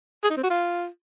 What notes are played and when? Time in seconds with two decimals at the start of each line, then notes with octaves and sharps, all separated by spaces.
0.23 G#4
0.30 D#4
0.37 C4
0.43 F#4
0.50 F4